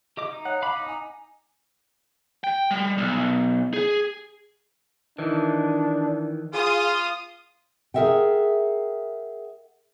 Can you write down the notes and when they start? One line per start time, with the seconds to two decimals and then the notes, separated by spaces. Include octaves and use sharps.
0.17 G4 D#5 D6
0.32 D#4
0.45 C#5 F#5
0.62 F5 B5 D6
0.76 D#4
0.88 G#5
2.44 G5
2.71 G3
2.98 B1
3.74 G#4
5.18 D#3 E3 D4
6.53 F4 G#4 D#6
7.94 G#4 A#4 E5 F#5 G5